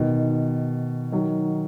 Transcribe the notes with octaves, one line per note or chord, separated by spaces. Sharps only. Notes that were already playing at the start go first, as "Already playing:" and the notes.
Already playing: B2 D#3
D#3 F#3